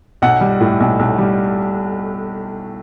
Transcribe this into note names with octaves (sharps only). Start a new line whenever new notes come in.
B1 F#5
G3
A2
B1
B1
G3